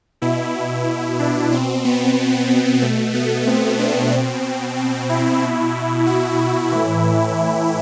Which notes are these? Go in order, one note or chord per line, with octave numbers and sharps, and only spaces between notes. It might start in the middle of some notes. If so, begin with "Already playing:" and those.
B2 E4
D4
B2 C4
B3
B2 A3
B3
C4
D4
B2 C4
C4
C4
E4
B2
F#4
A2 E3 E4